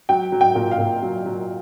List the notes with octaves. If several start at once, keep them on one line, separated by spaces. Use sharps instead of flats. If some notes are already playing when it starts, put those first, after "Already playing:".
F#3 G5
F#3
G5
A#2
F5
A#2
F#3
F#3